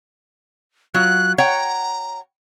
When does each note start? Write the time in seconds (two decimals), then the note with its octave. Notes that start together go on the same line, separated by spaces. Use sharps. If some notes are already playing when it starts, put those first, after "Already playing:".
0.94 F#3 F4 F#6
1.38 C#5 F#5 G5 A#5